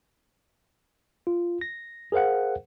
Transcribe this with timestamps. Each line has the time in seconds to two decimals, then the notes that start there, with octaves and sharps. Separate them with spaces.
1.27 F4
1.61 A#6
2.12 G#4 A#4 C5 F5 F#5